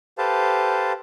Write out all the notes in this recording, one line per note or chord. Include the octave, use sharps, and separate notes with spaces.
G4 A4 B4 C5 F5 A5